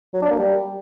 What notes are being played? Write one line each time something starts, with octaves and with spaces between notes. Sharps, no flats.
F#3
D4
A#3
G3